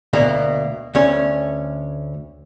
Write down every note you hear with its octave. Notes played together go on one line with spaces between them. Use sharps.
D2 B2 A#3
D2 A3 C#4 C#5